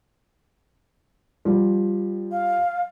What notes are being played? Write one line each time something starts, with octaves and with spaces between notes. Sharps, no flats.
F3 G3
F5